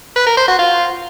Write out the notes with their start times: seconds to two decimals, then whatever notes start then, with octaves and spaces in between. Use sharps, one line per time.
0.16 B4
0.26 A#4
0.37 C5
0.48 F#4
0.59 F4